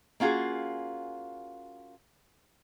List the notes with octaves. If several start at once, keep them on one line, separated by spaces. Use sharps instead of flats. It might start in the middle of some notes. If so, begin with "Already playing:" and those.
A#3 C#4 F4 F#4 G#4